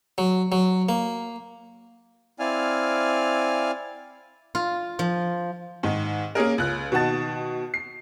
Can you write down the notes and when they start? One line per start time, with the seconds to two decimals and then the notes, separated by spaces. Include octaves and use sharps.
0.18 F#3
0.52 F#3
0.89 A#3
2.39 C4 E4 D5 F5 G#5 F6
4.55 F4
4.99 F3
5.83 G#2 D#3
6.35 A#3 C#4 G#4 A#4
6.58 C#2 F#6
6.92 B2 D#3 F#5 A5 A6
7.74 C7